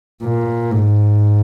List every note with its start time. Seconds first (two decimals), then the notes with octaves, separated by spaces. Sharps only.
0.24 A#2
0.71 G#2